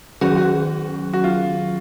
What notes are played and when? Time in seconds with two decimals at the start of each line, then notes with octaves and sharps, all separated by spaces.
0.21 D#3 F#3 C#4 F#4 G#4
0.37 F#4
1.13 F#4
1.24 F4